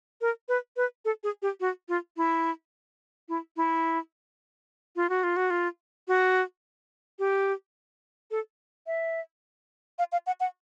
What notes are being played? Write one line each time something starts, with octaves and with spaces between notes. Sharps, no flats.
A#4
B4
B4
A4
G#4
G4
F#4
F4
E4
E4
E4
F4
F#4
F4
F#4
F4
F#4
G4
A4
E5
F5
F5
F#5
F#5